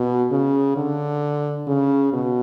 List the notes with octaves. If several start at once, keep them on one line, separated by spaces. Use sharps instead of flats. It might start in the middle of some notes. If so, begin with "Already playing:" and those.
Already playing: B2
C#3
D3
C#3
B2